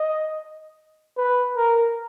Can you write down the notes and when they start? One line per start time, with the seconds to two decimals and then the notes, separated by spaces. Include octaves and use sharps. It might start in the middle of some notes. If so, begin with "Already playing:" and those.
Already playing: D#5
1.18 B4
1.57 A#4